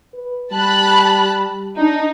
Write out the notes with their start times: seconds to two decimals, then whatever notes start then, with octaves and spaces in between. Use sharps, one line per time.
0.13 B4
0.52 G3 A5 B5 F#6
1.77 D4 D#4